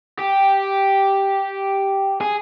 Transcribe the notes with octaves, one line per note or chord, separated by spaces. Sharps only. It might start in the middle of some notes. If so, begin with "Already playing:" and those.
G4
G#4